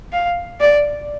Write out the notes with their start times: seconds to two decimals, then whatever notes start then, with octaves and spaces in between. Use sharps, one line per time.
0.13 F5
0.60 D5